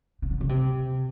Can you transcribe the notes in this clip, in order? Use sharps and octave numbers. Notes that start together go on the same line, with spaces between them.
C#3
D3
C#3
C3